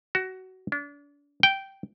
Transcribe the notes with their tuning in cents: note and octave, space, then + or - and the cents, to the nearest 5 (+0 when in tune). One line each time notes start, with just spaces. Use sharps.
F#4 +20
D4 -35
G5 -10